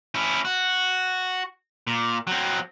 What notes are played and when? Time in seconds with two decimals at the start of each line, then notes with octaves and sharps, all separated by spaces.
0.15 C#4 E4
0.45 F#4
1.87 A#2
2.27 F#3 C4